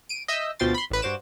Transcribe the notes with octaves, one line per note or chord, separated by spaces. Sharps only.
D7 D#7
D#5 E5 E6 G6
D2 B2 F3 G5 C6 A6
B5 C6
A1 B4
G2 F#4 C5 D6 E7